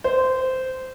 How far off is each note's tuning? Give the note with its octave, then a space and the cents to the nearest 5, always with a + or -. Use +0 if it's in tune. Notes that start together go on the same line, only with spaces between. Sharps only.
C5 -15